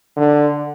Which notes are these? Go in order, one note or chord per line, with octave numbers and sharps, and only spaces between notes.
D3